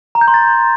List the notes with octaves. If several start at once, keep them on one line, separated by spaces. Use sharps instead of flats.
A#5
G6
C6
A6